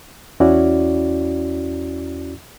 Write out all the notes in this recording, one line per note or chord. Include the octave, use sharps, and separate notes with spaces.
E2 C#4 E4 F#4 D5